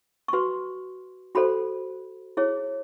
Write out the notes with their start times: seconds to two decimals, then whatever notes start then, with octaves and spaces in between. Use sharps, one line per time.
0.28 C#6
0.33 F#4 B4 C6
1.35 F#4 A4 C5 B5
2.37 E4 G#4 C#5